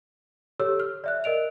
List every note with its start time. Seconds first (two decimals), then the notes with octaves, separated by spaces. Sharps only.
0.60 G4 A4 C#5 E6
0.80 F6
1.04 D5 E5 F#6
1.24 A#4 D#5 D7 F7